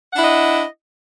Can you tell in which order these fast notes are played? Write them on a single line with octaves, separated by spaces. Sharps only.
F#5 D4 E4 D#5